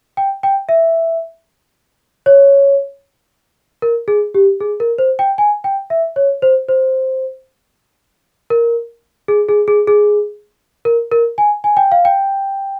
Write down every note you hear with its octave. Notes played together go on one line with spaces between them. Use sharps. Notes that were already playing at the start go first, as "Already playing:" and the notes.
G5
G5
E5
C#5
A#4
G#4
G4
G#4
A#4
C5
G5
G#5
G5
E5
C#5
C5
C5
A#4
G#4
G#4
G#4
G#4
A#4
A#4
G#5
G#5
G5
F5
G5